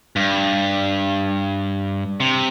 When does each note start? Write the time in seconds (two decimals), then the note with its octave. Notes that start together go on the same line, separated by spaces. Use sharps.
0.16 G2
2.20 C3